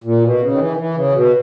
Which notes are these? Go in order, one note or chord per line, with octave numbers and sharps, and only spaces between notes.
A#2
B2
C#3
D#3
E3
D#3
E3
C#3
B2